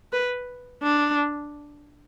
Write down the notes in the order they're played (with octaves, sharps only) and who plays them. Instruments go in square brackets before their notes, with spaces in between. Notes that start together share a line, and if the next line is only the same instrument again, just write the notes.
[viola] B4
D4